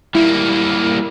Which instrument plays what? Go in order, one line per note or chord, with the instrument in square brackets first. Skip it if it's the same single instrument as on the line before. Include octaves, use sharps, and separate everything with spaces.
[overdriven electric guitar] G3 A#3 [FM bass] E4